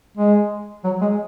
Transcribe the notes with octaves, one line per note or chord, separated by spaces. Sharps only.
G#3
F#3
G#3